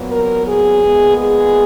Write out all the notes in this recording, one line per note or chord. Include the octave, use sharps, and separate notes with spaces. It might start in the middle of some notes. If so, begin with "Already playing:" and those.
Already playing: A#2 F#3 B3
A#4
G#4
A#2 G#3 B3
G#4